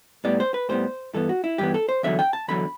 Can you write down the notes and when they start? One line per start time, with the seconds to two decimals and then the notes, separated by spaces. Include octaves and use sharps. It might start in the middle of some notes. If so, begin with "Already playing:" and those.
0.24 A2 G3 B3 D5
0.40 C5
0.54 B4
0.69 A2 G3 B3 C5
1.14 G2 E3 B3 A4
1.29 F#4
1.44 E4
1.58 G2 E3 B3 G4
1.74 A4
1.89 C5
2.03 E2 D3 F#3 E5
2.19 G5
2.33 A5
2.48 E2 D3 F#3 B5